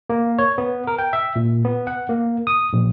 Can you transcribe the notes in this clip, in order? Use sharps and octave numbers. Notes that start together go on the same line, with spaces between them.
A#3
C#5
B3
A#4
G5
E5
A#2
B3
F#5
A#3
D#6
A#1